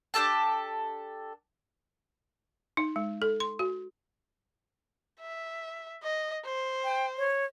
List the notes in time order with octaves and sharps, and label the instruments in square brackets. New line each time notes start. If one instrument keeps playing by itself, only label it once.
[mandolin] D4 G4 A4 A5
[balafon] D#4
G#3
A4
C6
F#4
[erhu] E5
D#5
C5
[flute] G5
C#5